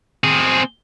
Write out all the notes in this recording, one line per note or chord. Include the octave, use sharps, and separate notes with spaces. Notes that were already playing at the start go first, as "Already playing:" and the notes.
C4 G#4